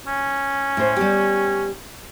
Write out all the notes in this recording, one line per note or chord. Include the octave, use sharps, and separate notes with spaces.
C#4
A2 C5
G3 B3 G4